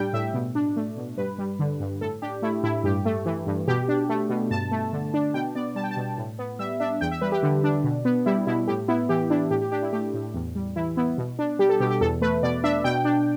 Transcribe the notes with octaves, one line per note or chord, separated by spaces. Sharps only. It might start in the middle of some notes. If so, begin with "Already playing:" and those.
Already playing: A2 G3 D4 G5
A2 E5
B2
D4
A3
B2
G2 B4
G3
D3
G2
A2 A4
D4 G4
A3 E4
A2 E4
G2 G4
A3
E3
G2
B2 G4
D4
A3
B2
G2 A5
A3
D3
D4
B2 G5
B3 D5
G3 A5
G5
A5
B2
A2
B3
G3 E5
D4 E5
E2 G5
E5
G3 B4
G4
D3
D4
B2
B3
G3 E4
B2 E4
A2 G4
B3 E4
E3 G4
D4 E4
A2 G4
G4
D4 G4
E4
A3 G4
A2
E2
G3
E3 E4
B3 E4
B2
D4
G3 G4
A4
B2 G4
G4
E2 A4
A3 B4
B2 D5
D4 E5
B2 G5
D4